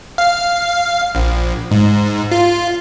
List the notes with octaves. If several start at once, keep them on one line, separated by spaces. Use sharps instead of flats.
F5
A#1
G#2
F4